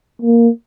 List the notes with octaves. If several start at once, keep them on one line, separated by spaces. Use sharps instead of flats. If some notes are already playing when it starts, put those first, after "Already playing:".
A#3